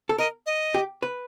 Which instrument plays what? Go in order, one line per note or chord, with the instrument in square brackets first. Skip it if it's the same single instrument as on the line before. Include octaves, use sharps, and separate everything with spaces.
[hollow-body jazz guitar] A4
[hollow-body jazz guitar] A#4 [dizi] D#5
[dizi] D#5
[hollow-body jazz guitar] G4
B4